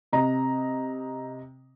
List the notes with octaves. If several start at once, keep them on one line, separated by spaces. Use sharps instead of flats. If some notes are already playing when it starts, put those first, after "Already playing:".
C3 D#5 A#5